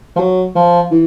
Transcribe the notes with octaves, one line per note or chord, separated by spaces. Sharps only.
F3
F#3
F3
E3